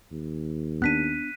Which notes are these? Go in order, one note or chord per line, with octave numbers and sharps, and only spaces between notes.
D#2
B3 D4 F#6 B6 D#7